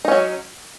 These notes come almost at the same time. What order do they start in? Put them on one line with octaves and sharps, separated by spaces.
D#4 C#4 F#3